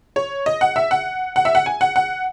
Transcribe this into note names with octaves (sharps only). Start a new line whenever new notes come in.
C#5
D#5
F#5
E5
F#5
F#5
E5
F#5
G#5
F#5
F#5